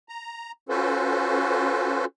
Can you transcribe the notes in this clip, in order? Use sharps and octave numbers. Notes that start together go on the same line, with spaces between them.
A#5
C#4 F4 F#4 A4 B4 C5